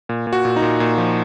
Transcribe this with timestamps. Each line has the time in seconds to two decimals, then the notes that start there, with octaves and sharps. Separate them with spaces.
0.09 A#2
0.27 A#2
0.33 F#4
0.45 A#2
0.56 D#4
0.62 A#2
0.80 A#2
0.98 F3